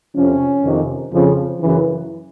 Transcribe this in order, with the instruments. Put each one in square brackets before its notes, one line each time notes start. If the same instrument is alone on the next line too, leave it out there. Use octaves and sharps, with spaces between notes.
[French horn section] F2 C3 F3 C#4
F2 C3 D#3
F2 C#3 F3
F#2 C#3 E3